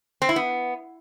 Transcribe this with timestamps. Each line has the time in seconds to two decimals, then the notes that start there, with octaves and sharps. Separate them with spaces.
0.22 C4
0.29 E4
0.36 B3